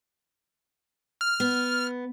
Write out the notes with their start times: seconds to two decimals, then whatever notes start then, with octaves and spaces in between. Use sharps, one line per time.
1.21 F6
1.40 B3